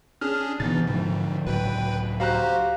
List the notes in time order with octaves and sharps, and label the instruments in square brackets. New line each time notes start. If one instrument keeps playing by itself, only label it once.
[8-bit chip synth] C#4 D4 G#4 [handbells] F6
[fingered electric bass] C3 B3 [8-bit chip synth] E3 D#4 [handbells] A6
[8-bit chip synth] G#2 [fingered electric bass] D3 F3
[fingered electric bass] C#2 A2 F#3 [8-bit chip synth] B4 G5 B5
[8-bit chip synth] F#4 G4 C5 [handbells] F5 A#5 F#6